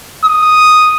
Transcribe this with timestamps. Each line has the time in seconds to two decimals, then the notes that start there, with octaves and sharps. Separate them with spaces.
0.25 D#6